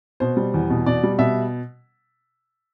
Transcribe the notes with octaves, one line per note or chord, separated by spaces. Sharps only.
B2 C5
G3
E2
B2
B2 D5
G3
B2 E5